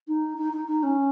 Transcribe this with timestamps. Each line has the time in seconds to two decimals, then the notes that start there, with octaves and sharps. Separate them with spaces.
0.08 D#4
0.38 D#4
0.53 D#4
0.68 D#4
0.83 C#4